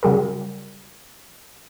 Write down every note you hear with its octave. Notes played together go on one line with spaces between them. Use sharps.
C#3 F#3 G3 G#4 A#4